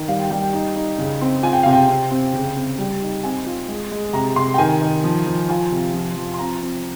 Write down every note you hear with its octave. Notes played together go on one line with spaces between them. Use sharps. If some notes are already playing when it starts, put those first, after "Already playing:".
Already playing: D#3
G3 F5
G5
G3 G5
G5
D#4
D#4
C#3
C4
F4 G#5
G5
C3 F5
G5
C4
C4
C#3
C4
G3
D#4
C4 G#5
F4
G#3
G#3
C3 A#5
C3 C6
G5
D#3 G#5
D#3
F3
F3
F4 G#5
C3
F3
F3
C6
C4 A#5
C4